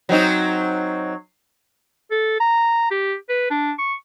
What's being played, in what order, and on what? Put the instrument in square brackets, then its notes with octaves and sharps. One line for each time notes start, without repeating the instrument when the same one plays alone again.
[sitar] F#3 C4 D#4
[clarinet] A4
A#5
G4
B4
D4
C#6